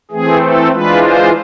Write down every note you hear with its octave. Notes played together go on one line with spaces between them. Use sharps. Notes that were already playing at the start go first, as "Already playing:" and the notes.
E3 A3 C4 G#4
A4
E3 G#3 D4 F4 B4
C5